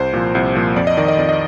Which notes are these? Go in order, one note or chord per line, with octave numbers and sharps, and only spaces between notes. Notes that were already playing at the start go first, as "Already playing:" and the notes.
Already playing: C2 C5
A#2 F3
C2
A#2 F3
F2 D5
D#5
D#3 D5
D#5
F2 D5
D#5